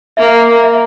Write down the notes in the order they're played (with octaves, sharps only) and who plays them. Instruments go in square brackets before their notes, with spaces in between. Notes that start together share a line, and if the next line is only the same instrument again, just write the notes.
[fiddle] A#3 [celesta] E5
[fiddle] A#3
[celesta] E5